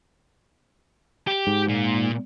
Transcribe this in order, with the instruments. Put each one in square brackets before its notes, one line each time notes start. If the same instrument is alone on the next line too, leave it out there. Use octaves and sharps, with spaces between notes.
[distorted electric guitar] G4
[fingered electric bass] G#2
[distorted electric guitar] A#2